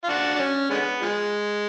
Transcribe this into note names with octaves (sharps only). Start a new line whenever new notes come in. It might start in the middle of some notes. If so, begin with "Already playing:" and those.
F4
D4 F#4
D4
C#4
D3 G#3 B3
F3 G#3